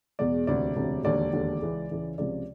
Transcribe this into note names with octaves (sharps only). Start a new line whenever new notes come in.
E2 B2 G#3 D5
E1 D2 C3 D5
E1 D2 C3
E1 D#2 D3 D5
E1 D#2 D3
C#2 C#3 E3 G#3
C#2 C#3 E3 G#3
C#2 C3 F3 G#3 D5